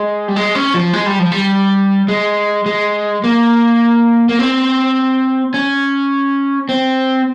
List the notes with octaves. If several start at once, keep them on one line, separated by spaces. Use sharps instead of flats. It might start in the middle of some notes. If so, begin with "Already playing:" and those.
Already playing: G#3
G3
G#3
C#4
F3
G#3
G3
F3
G3
G#3
G#3
A#3
A#3
C4
C#4
C4